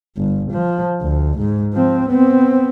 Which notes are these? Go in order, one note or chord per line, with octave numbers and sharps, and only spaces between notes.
G1
F3
D2
G#2
F3 C4
B3 C4